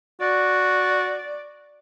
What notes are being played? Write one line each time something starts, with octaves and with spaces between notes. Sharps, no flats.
F#4 D5